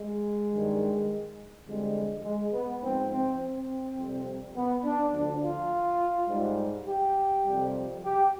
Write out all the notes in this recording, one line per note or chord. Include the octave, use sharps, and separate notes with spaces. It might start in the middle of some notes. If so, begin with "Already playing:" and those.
Already playing: G#3
G2 D#3 G3
F2 D3 G3 G#3
G#3
B3
G#2 F3 C4
C4
C4
F2 C3 G3
B3
D4
D2 D3 F3 D4
F4
G#2 G3
G4
F2 C3 G3
G4